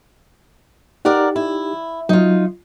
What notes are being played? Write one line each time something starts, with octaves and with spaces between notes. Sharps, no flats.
D#4 G4 A#4 D5 F#5
E4
F#3 D#4 F4